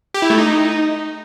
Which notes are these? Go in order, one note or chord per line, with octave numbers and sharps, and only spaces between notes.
G4
E4
A3
D#4